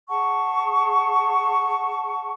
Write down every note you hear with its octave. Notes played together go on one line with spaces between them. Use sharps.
G#4 F#5 A5 C#6